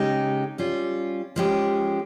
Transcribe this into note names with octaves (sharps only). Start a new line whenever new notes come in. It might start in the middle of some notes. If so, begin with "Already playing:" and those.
Already playing: C#3 G#3 D#4 G4
G3 C#4 F4
F3 G#3 C#4 G4